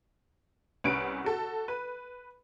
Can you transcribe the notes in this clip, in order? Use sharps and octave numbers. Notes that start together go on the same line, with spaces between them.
C2 C#4 B4 F#5 D7
F#4 A4
B4